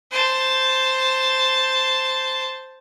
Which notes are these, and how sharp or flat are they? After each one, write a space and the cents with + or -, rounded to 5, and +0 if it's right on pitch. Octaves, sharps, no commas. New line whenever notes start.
C5 +0 A5 +0